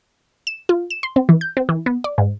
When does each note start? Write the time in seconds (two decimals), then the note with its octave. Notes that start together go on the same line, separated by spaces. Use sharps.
0.47 E7
0.69 F4
0.91 E7
1.03 C6
1.16 C4
1.29 E3
1.41 G6
1.57 C4
1.69 E3
1.86 B3
2.04 D5
2.18 G#2